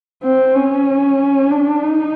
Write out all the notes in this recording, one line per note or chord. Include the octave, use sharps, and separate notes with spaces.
C4
C#4
D4
D#4